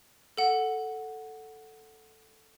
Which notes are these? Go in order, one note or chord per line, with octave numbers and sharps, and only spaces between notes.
A4 F#5